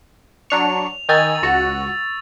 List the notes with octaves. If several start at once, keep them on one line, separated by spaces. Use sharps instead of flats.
F#3 D4 C#6 F7
D#3 D#4 G#5 C#6 E6 A6
C#2 F#4 F#6